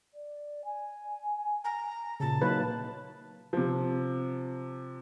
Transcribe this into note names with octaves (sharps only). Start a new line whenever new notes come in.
D5
G#5
A#5
A#2 C#3 G#4 A5
F#3 A#3 D#4 F4 B4
C3 F3